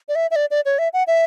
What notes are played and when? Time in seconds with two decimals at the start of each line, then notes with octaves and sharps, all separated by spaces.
0.09 D5
0.15 E5
0.31 E5
0.36 D5
0.51 D5
0.65 C#5
0.79 E5
0.93 F#5
1.07 E5